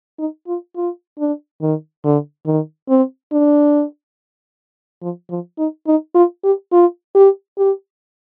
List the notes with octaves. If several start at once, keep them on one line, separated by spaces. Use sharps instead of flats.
D#4
F4
F4
D4
D#3
D3
D#3
C4
D4
F3
F3
D#4
D#4
F4
G4
F4
G4
G4